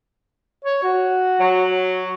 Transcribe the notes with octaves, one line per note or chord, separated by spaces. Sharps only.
C#5
F#4
F#3